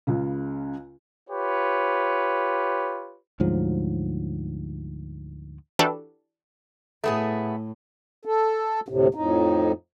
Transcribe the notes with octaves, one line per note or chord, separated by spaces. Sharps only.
C#2 C#3
F4 G4 B4 C#5
D2 G#2 F3 F#3
E3 D4 F#4 G4 A4 B4
A2 A3 B3 G#4
A4
D2 A2 C3
F2 A2 D#4